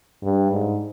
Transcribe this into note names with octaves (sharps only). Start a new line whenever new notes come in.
G2
G#2